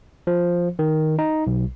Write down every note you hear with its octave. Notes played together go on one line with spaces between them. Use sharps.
F3
D#3
D#4
B1